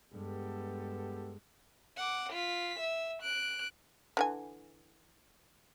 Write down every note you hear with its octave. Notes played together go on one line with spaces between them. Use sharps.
G2 G#3 B3 G4 A4
F#5 D6
F4 B6
E5
F#6 D7
D3 E3 G#5